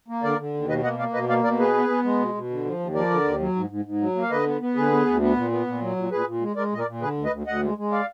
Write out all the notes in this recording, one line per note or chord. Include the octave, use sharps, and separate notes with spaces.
A#3
D3 A#4 D5
D3
D#2
B2 B4 D#5
A#3 D#5 F#5
A#3 D5 F5
B2 B4 D#5
A#3 D5 F5
B2 A#4 D5
B3 G#4 B4
B3
B3
G#3
B2
B2
D3
F3
D#2
F3 A#4 D5
D3
D#2
F#3
G#2
G#2
G#2
F#3
A#3
F5
D3 B4 D#5
B3
B3
D3 G#4 B4
B3
D2
B3
A#2
B3
A#2
F#3
A#2
A#2 G#4 B4
A#2
G#3
G#3 A#4 D5
A#2 D#5
A#4 D5
A#2
D3 G#4 B4
D2
B4 D#5
D2
D2 D#5 F#5
G#3
G#3
D5 F5